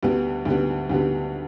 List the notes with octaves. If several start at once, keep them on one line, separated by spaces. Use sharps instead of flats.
D2 D3 G3 B3
D2 D3 G3 B3
D2 D3 G3 B3